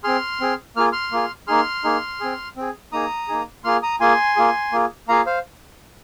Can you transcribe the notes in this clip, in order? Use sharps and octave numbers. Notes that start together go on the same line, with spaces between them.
C4 G#4 C6 F6
C4 G#4
A#3 F4 G#4 F6
C6 F6
A#3 F4 G#4
A#3 D#4 G#4 C6 F6
A#3 D#4 G#4
C4 G#4
C4 G#4
A#3 D#4 G#4 A#5 D#6
A#3 D#4 G#4
A#3 F4 G#4 C6 F6
A#5 D#6
A#3 F4 G#4 G#5 C6
A#3 F4 G#4
A#3 F4 G#4
A#3 F4 G#4 F5 A#5
C5 F5